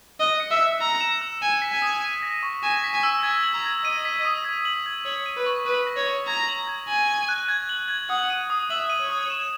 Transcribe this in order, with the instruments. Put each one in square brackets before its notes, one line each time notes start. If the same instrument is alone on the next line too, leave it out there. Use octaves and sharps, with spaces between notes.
[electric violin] D#5 [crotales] F#6
[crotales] C#7
[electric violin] E5
[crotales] F#6
[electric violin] A#5 [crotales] E6
[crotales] E7
E6
[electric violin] G#5 [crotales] E7
[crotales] B6
[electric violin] G#5
[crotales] D#6
D#7
A#6
C#6
[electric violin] G#5 [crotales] E7
[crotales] B6
[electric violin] G#5
[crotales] E6
[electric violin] G#5 [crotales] G#6
[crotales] F#7
[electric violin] A#5
[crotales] G#6
[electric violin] D#5 [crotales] D#7
[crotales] B6
D#6
G#6
F#7
G#6
[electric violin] C#5 [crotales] F#7
[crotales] D#7
[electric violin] B4
[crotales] C#6
[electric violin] B4 [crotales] C#6
[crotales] A#6
[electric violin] C#5
[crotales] C#6
[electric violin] A#5 [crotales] G#6
[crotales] F#7
G#6
[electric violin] G#5 [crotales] F#7
[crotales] D#7
F#6
G#6
F#7
G#6
[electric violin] F#5 [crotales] D#6
[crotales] D#7
D#6
[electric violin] E5 [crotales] F#7
[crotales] D#7
[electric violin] C#5
[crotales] D#6
E7